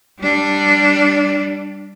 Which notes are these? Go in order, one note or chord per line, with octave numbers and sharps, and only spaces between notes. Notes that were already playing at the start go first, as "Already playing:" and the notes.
G3 D4